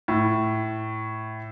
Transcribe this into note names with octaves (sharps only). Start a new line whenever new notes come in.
A2